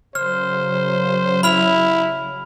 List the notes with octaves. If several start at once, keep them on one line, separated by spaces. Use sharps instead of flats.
C#3 F#3 C5 F6
E4 B5 F6 F7